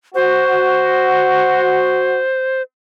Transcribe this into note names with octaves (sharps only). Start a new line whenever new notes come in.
F#4 C5